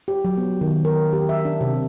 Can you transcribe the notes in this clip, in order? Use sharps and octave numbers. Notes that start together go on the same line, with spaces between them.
G4
F#3
B3
D#3
A#4
G4
E5
D4
C3